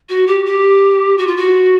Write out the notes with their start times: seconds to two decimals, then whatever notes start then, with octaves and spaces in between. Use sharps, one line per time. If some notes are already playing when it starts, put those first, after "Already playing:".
0.09 F#4
0.27 G4
0.46 G4
1.18 F#4
1.27 F4
1.37 F#4